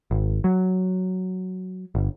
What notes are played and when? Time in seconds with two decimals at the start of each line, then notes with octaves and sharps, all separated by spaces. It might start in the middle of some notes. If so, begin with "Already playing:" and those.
0.11 G#1
0.44 F#3
1.95 G1